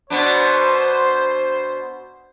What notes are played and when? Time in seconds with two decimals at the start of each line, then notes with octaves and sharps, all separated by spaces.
0.10 B2 B3 D4 C5